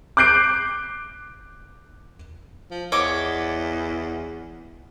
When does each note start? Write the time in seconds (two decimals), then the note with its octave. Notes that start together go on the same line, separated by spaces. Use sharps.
0.17 D6 F#6 G6 C7 D7
2.71 F3
2.92 E2 C#5 D#5 D6